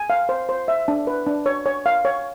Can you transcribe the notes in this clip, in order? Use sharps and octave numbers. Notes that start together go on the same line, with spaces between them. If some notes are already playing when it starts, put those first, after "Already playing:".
Already playing: G#5
F5
C5
C5
E5
D4
B4
D4
C#5
C#5
F5
C#5